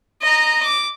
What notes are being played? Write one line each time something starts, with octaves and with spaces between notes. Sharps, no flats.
D#5 A#5
D6